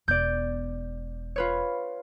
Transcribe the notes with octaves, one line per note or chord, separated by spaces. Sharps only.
E1 B3 D5 G6
F4 B4 C#5